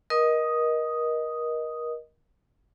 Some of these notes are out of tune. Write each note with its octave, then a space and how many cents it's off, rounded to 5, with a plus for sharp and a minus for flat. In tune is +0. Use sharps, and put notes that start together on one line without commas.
A#4 +30 D#5 +0 D#6 +0